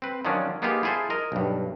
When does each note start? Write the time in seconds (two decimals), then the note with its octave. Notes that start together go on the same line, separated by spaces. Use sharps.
0.02 C4 B4
0.25 D#3 F3 F#3 C#4 D4
0.62 A#3 B3 D#4 F4 G4 G#4
0.83 E4 F4 G#4 A4 C5
1.10 A#4 D#5
1.32 B1 G2